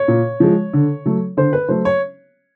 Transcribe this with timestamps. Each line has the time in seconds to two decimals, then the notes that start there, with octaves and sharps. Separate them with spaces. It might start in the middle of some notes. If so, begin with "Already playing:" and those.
Already playing: C#5
0.08 A#2
0.40 F3 G#3
0.73 D3
1.06 F#3 A3
1.37 D3 C5
1.53 B4
1.69 F#3 A3 C5
1.85 C#5